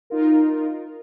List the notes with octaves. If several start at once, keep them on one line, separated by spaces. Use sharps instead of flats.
D#4 F4 A#4